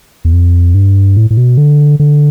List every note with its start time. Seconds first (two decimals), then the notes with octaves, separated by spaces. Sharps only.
0.25 E2
0.33 F2
0.74 G2
1.16 A2
1.31 A2
1.37 B2
1.57 D3
2.00 D3